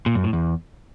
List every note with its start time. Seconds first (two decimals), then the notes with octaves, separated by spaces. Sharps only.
0.06 A#2
0.15 F#2
0.24 A2
0.33 E2